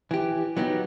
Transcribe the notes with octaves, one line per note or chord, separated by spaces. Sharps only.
E3 G4
F#3 B3 D#4 G4